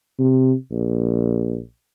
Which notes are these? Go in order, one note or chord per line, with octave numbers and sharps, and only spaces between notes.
C3
A#1